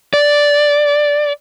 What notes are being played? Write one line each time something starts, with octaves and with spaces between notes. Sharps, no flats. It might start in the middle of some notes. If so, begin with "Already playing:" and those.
D5